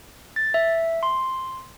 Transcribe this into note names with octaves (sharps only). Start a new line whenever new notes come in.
A6
E5
C6